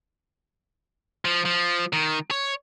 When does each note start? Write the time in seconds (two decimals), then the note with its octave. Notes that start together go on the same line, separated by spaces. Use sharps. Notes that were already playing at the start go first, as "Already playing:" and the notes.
1.25 F3
1.45 F3
1.93 D#3
2.31 C#5